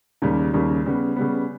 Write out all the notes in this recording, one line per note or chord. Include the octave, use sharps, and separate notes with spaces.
D#2 C#3 G3
D#2 C#3 G3
C#3 G3 B3
C#3 G3 B3